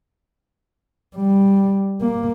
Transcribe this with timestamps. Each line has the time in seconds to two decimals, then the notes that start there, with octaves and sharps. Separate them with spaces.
1.16 G3
2.02 A#3